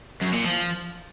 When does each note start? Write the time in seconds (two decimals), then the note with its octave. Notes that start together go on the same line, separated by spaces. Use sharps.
0.22 F#2
0.34 A#2
0.45 F3